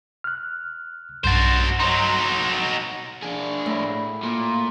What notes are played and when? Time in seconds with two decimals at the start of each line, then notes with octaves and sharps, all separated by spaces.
0.24 F6 F#6
1.24 B1 G2 F#4 C5 A6
1.79 F#3 D#4 C6
3.23 D4 G#4
3.66 A2 B5
4.23 A#2